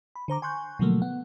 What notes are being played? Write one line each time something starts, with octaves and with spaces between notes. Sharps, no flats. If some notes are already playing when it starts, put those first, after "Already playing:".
B5
D3 C5 A#5 D6
G#5 C6 C#6 F#6 G6
B2 D3 F3 F#3 A3 A#3
B3 F#5